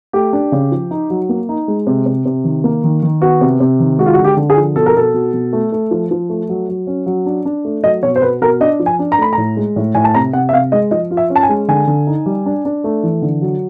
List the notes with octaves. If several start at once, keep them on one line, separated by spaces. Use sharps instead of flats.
A3 G4
D4
C#3
F3
D#4
F#3
A#3
D#4
G#3
C3
C3
C3
D#3
A#3
D#3
D#3
B3 F#4
C3
C3
D#3
G#3 F#4
F4
F#4
D3
G4
D3
G#4
F3
B2 A4
A#4
B2 A4
B2
B2
A3
A3
F3
F3
A3
F#3
F#3
C#4
F#3
D4
D4
A3
F#3 D#5
B2 C#5
C5
B2 B4
B2 A#4
D4 D#5
F3
G#5
D4
A#5
A3 B5
A#5
A2
G#3
A2
A2 G#5
A5
C3 A#5
C3 F#5
E5
C3 F5
G#3 D#5
F3 D#5
F4
E5
C#4
A5
G#5
G#3
D3 G#5
D3
D#4
G3
D4
D4
A3
E3
D3
F#3